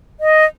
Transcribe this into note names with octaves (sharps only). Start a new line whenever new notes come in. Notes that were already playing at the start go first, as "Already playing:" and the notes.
D#5